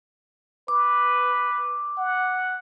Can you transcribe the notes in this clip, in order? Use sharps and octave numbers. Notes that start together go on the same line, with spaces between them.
B4 D6
F#5